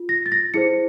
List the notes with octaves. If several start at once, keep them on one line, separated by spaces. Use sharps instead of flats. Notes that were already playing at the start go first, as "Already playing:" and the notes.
Already playing: F4
A#6
A6
A#6
E4 G#4 C5 C#7